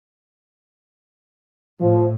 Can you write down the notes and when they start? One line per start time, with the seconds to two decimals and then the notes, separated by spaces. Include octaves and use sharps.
1.81 A2 F3